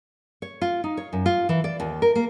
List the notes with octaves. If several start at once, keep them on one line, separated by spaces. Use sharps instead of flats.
C#5
F4
D#4
C#5
F#2
F4
E3
D5
D#2
A#4
A#3